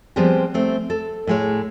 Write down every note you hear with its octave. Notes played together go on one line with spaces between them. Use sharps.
F3 G3 G#3 B3 C4 G4
A3 C4
A4
A2 G#3 C#5